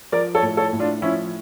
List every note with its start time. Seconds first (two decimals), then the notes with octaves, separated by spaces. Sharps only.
0.12 F3 A#4 D5
0.35 A4 C#5
0.42 A2
0.57 A4 C#5
0.73 A2
0.80 D4 F4
1.02 F3 C#4 E4